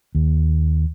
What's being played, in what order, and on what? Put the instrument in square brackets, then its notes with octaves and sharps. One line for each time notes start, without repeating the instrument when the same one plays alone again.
[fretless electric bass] D#2